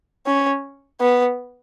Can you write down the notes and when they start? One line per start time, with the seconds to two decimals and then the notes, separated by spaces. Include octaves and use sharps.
0.26 C#4
1.01 B3